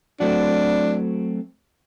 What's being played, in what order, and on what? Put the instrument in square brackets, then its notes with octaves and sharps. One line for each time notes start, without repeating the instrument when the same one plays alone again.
[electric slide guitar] F#3 A3 C4 F#4 [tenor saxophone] D4